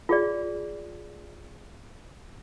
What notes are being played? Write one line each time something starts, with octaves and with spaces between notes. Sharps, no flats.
F4 G#4 D5